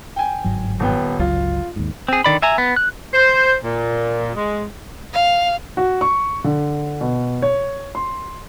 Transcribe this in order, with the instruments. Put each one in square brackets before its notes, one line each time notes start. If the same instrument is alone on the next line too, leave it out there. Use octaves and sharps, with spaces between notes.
[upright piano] G5 G#5
[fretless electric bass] G1 G#2 F#3
[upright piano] D#1 B3 G5
[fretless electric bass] G1 C#2 F#3 [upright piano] F4
[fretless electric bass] D#2 G#2
[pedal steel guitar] C4 G#4
D3 D#3 D5 B5
E5 G#5 A#5
B3
F#6
[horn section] C5
A#2
G#3
[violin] F5
[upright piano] F#4
C#6
D3
B2
C#5
C6